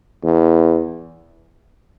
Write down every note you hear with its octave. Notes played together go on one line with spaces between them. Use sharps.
E2